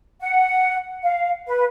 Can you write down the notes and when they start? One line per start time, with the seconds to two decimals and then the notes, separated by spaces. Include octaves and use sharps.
0.22 F#5
1.03 F5
1.47 B4